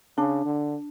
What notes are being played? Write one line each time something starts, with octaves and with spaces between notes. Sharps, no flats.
C#3 D4
D3